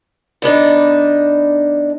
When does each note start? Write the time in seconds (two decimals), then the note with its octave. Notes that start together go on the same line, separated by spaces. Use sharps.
0.42 D3 B3 D4 D#4